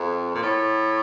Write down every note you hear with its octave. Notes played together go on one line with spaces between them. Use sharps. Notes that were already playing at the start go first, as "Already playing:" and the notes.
Already playing: F2
A#2
A2